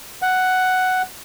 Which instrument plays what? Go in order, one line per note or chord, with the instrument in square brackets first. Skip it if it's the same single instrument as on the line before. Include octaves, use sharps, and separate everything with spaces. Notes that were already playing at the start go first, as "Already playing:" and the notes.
[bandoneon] F#5